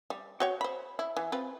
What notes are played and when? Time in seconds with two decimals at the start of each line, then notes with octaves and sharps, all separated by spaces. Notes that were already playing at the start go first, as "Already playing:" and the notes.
0.10 G3
0.40 F#4 C#5 G5
0.61 C5 B5
0.99 E4
1.17 E3
1.32 C4 F4 B4